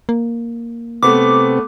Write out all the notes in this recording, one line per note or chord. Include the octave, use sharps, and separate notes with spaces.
A#3
C3 A3 B3 C4 D6